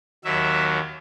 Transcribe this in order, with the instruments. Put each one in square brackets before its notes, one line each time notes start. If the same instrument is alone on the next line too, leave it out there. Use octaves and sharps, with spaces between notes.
[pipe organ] D#2 D#3 F#3 E5